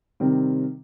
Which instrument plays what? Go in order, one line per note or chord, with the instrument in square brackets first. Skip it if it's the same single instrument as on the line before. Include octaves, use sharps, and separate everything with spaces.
[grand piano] C3 D#3 G3 C4